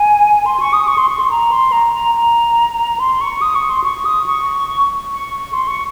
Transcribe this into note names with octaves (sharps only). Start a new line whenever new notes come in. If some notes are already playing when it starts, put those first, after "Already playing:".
Already playing: G#5
C6
C#6
D#6
C#6
C6
C#6
C6
A#5
C6
A#5
A#5
A#5
C6
C#6
D#6
C#6
C6
C#6
D#6
C#6
C#6
C6
C#6